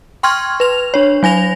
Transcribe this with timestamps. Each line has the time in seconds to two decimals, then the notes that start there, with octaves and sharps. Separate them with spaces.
0.23 G5 C6 C#6 F6 G#6
0.60 B4 F7
0.94 D4 C#5
1.23 F#3 G#5 A#6 F7